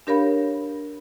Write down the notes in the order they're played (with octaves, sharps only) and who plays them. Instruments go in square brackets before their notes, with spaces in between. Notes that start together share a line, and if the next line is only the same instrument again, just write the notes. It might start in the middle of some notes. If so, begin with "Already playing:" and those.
[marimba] D4 G4 A#4 C#5 F5 B5